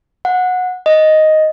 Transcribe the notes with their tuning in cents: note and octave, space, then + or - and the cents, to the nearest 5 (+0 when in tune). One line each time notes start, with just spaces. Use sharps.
F#5 -20
D#5 +5